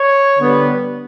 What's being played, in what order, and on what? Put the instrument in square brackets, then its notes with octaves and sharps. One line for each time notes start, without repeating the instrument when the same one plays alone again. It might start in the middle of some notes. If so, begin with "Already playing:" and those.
Already playing: [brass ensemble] C#5
D3 G3 B3